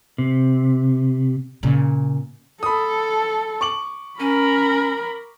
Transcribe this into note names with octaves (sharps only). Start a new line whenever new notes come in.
C3
A#2 C#3
A4 B5 D#6
C#6 D6 F#7
C#4 A#4 B5